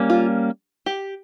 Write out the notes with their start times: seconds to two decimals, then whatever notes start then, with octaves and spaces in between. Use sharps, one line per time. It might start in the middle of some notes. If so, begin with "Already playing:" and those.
Already playing: G3 A#3 C#4
0.10 F4
0.86 G4